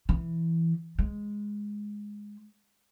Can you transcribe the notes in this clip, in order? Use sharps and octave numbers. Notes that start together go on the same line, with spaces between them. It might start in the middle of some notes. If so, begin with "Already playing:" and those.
E3
G#3